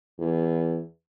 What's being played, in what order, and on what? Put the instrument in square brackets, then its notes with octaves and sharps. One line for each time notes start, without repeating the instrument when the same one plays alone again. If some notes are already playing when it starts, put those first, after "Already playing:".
[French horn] E2